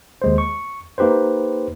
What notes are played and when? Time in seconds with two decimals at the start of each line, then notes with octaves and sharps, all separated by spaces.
0.22 D#2 G#3 C5
0.38 C#6
0.98 A#3 D#4 G4 B4 C5